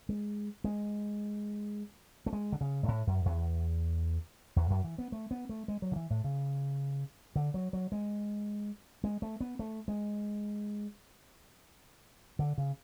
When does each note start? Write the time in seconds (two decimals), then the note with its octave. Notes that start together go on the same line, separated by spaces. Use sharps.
0.09 G#3
0.64 G#3
2.26 A3
2.33 G#3
2.52 D3
2.61 C#3
2.83 G#2
2.88 A2
3.07 F#2
3.25 E2
4.56 E2
4.70 F#2
4.84 E3
4.98 B3
5.12 A3
5.31 B3
5.49 A3
5.68 G#3
5.82 F#3
5.92 D3
5.96 E3
6.10 A2
6.24 C#3
7.36 D3
7.54 F#3
7.73 F#3
7.92 G#3
9.04 G#3
9.22 A3
9.41 B3
9.59 A3
9.88 G#3
12.39 D3
12.58 C#3